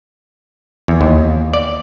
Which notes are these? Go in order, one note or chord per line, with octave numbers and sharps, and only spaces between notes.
E2
D#2
D5